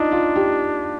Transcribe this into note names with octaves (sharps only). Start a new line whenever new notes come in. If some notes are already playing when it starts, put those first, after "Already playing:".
Already playing: D4 D#4 F4
F4
G4